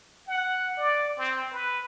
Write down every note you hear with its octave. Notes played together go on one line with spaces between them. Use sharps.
F#5
D5
C4
B4